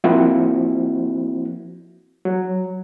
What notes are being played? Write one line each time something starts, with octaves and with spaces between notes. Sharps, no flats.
F3 A#3 C4 E4 F#4
F#3